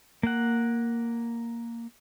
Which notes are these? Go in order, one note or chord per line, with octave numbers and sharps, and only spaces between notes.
A#3 F#5